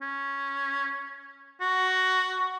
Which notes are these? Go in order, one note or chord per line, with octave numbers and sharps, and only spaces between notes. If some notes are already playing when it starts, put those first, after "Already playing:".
C#4
F#4